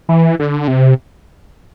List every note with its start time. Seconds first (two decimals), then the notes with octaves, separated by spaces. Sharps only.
0.09 E3
0.39 D3
0.68 C3